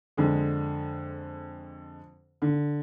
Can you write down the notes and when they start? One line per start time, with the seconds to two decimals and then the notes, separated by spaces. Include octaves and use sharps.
0.17 F2 D3 G#3
2.42 D3